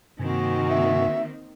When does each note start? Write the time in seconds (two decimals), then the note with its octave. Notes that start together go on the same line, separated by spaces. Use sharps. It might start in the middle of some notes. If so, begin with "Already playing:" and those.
0.19 G2 C3 D#3 A#3 C4 F#4 G#5
0.69 E5